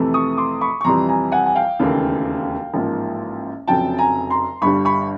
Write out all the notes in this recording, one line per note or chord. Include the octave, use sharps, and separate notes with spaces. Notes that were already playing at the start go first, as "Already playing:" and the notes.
Already playing: F2 C3 E3 A3
C#6 D#6
C6 D6
B5 C#6
C#6
F2 C3 E3 G3 A#5 C6
G#5 A#5
F#5 G#5
G#5
F5 G5
E1 D#2 C#3 E3 A3
A1 G#2 F3 A#3
F1 F2 C#3 F#3 G5 A5
G#5 A#5
A#5 C6
G1 G2 D3 G3 B5 C#6
B5 C#6